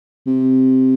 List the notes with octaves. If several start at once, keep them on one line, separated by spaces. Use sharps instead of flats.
C3